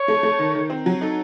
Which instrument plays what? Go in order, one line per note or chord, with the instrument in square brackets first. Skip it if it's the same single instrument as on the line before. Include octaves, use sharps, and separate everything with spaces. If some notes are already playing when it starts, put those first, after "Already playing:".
Already playing: [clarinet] C#5
[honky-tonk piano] A3
A3
D#3
D#3
C4
F#3
[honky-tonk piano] D#4 [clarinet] A4